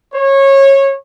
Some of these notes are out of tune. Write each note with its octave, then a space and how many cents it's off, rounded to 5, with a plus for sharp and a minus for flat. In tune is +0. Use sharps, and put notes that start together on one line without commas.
C#5 -20